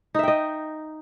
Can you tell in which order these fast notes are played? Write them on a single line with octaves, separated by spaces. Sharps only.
D#4 E5 G5 D#5